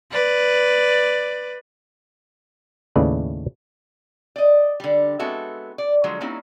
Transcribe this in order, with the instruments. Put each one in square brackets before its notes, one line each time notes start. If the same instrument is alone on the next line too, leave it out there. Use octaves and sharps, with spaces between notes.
[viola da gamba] B4 D5
[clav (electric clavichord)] D#2 A2 C#3 B4 D5 E5
[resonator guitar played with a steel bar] D5 D#5
D3 G3
G#3 B3 C4 F#4 A4 E5
D5
D3 F3 F#3 G#3
G3 A#3 C4 C#4 D#4 E4